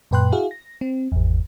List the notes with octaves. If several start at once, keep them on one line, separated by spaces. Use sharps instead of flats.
F#2 A#2 B4 G5 C6 F#6
E4 F#4 G#4 F5
A#6
C4
G#1 E2